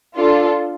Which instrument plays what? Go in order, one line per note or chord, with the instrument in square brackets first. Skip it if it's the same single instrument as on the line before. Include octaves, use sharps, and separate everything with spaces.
[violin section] D4 F4 A4